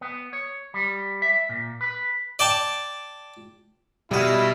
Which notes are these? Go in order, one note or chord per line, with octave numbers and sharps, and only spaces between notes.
B3
C#5
G3
E5
A#2
B4
D5 G5 A5
G2 B2 G3 E4 F#4 D#5 F6